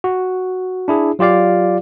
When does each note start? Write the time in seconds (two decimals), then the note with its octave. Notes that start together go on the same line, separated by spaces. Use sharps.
0.04 F#4
0.88 D4 E4 G#4
1.19 F#3 F4 G4 D5 F5